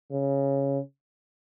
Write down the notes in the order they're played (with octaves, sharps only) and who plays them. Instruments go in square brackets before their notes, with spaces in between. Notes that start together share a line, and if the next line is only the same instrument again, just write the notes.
[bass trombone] C#3